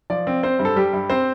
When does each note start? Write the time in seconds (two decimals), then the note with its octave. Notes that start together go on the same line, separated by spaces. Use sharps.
0.10 F3 D5
0.27 C4
0.43 C4 C5
0.59 G2
0.65 A4
0.76 G3 G4
0.93 G2
1.10 C4 C5